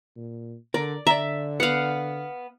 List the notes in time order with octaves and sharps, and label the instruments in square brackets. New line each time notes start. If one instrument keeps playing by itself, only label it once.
[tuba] A#2
[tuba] D3 [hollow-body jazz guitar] A#4 [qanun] D5
[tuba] D3 [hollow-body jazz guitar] D5 A#5 [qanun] E5
[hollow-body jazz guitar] B3 [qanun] F5 F#5